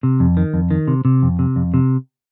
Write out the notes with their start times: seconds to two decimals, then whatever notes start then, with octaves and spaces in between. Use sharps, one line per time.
0.03 C3
0.20 F2
0.37 D#3
0.54 F2
0.71 D#3
0.88 C3
1.05 C3
1.23 F2
1.39 C3
1.56 F2
1.74 C3